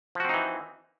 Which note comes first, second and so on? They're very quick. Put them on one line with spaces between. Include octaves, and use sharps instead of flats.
F3 F#4 C4 D#4 E3